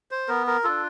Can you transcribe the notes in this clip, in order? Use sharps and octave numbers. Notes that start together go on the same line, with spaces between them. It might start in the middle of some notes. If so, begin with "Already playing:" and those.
C5
B3 A#4
A#4
D4 F4 A4